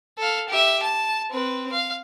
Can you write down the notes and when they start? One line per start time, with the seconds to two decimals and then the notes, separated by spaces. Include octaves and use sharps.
0.18 A4 F5
0.49 G4 E5
0.83 A5
1.31 C4 B4
1.72 F5